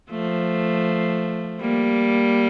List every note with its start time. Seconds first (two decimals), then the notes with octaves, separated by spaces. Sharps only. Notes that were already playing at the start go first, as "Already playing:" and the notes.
0.11 F3 A3
1.61 G3 A#3